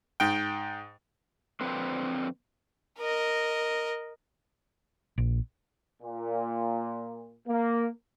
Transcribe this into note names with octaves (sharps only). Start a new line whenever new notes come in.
G#2 G5
F2 D3 C4 B4
A#4 D#5
A#1
A#2
A#3